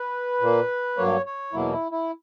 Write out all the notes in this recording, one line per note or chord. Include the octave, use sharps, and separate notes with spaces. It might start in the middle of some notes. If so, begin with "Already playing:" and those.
Already playing: B4
A#2 A#3
G2 F#3 A#3 C#5
C#5
E2 B2 F#3 A#3 E4
E4
E4